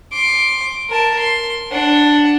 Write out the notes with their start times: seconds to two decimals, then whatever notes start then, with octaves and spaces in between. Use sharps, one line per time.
0.12 C6 D6
0.89 A#4 A5
1.19 C6
1.71 D4 F#5